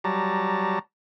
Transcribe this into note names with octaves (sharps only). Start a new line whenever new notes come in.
F#3 G3 A5 A#5